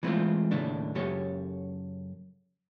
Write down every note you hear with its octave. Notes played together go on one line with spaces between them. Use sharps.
E3 G#3 A3 B3 C4 F4
D#2 A2 C#3 A3 D4
F#2 C#3 G4 A4 C#5